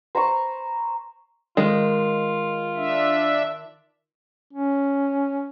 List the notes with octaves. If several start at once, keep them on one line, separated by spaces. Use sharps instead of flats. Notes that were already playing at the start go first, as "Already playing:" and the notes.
C5 A#5 B5 C#6
D#3 G#3 F4
D4 E5
C#4